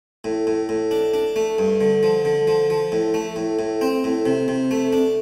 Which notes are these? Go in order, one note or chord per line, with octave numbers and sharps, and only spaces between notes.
A2
A2
A2
D4
D4
A3
G2
D3
F3
D3
F3
F3
A2
A3
A2
A2
C4
A2
C3
C3
A3
D4